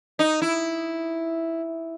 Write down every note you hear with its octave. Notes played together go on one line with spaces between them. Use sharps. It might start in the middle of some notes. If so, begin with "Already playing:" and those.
D#4
E4